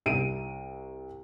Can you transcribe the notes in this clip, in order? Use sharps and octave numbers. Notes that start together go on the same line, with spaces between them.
C2 D7 D#7